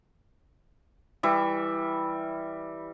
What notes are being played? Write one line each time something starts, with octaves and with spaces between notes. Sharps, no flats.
E3 G3 E5